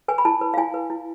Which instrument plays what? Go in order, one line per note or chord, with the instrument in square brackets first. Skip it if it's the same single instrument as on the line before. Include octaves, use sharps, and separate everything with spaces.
[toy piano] B4 G#5
B5
E4 A5
B4
F5
E4 G#5
B4
E4